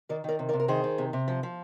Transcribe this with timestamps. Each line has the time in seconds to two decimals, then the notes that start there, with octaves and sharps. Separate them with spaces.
0.09 D#3 A#4 D5
0.24 D#3 A#4 D5
0.39 C3
0.49 A#4 D5
0.53 C3
0.60 A#4
0.68 D#3 G#4 C5
0.84 D#3
0.98 C3
1.13 C3
1.28 F3
1.43 F3